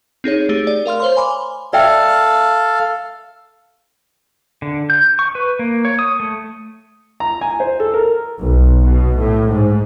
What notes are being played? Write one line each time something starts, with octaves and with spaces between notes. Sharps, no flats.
C4 D#4 G#4 C#5
A3 G4 G#4
D5
A#4 F5 C6 F6
C5 C#5 C6
G#5 B5 C6 D6
A4 D5 E5 F5 G5
D3
G6
C#6
B4
A#3
C#5
D#6
A3
A#5
G#5
C5
A4
A#4
B1
B2
A2
G#2